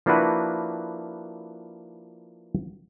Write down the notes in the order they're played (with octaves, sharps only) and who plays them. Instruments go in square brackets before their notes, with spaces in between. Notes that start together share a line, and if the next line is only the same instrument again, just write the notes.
[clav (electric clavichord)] F3 A#3 D4 E4 F#4 B4